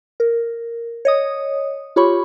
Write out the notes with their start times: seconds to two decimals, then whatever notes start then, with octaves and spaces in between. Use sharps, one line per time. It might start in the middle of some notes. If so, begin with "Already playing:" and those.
0.20 A#4
1.05 C#5 D#5 D#6
1.96 F4 G4 C#5 B5 C#6